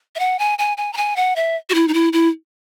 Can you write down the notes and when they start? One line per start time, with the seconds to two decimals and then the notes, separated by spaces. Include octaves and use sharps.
0.16 E5
0.19 F#5
0.39 G#5
0.59 G#5
0.77 G#5
0.93 A#5
0.97 G#5
1.16 F#5
1.36 E5
1.70 F#4
1.74 E4
1.88 D#4
1.94 E4
2.13 E4